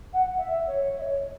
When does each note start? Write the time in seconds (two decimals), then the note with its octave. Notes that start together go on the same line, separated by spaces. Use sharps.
0.13 F#5
0.37 E5
0.67 C#5
0.97 E5
1.02 C#5